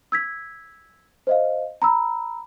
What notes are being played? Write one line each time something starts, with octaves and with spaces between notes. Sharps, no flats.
E6 G#6 B6
C5 D#5 F5
A#5 B5 E6